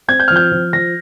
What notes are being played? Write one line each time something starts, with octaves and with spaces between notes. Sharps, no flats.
C4 G#6
G6
F3 F6
G6
F3
F3 A#6